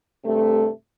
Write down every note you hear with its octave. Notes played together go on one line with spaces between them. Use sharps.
G2 C3 A3